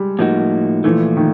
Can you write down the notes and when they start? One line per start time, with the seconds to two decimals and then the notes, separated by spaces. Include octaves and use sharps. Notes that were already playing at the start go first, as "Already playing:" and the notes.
Already playing: G3 G#3
0.19 A2 F3 A#3 D#4 F#4
0.84 A#2 E3 F3 A3
1.17 D#3